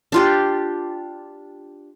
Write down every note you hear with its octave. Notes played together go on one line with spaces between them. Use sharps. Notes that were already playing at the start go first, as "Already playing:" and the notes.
D4 F4 G4